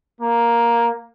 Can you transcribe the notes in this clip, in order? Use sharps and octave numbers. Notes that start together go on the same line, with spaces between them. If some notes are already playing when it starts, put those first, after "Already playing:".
A#3